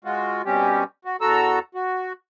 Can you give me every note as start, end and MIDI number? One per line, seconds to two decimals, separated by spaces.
0.05 0.42 56
0.05 0.42 65
0.05 0.42 66
0.45 0.84 47
0.45 0.84 55
0.45 0.84 60
0.45 0.84 61
0.45 0.84 67
1.05 1.16 66
1.21 1.59 40
1.21 1.59 66
1.21 1.59 69
1.21 1.59 82
1.21 1.59 88
1.75 2.13 66